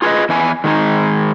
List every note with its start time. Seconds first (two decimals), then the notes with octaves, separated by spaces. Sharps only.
0.02 F4 G#4 A4 B4 D#5
0.29 E2 E4 G#5
0.64 D#3 G#3 D#4